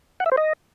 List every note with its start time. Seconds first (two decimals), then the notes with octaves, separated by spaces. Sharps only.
0.20 F#5
0.26 E5
0.32 C5
0.37 D#5